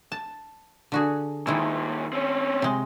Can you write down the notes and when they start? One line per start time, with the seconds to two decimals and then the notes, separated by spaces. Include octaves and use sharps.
0.12 A5
0.92 D3 F#4 G#4
1.47 D#2 A#2 D#3 G#3 E4
2.13 C4 C#4
2.62 C3 G#3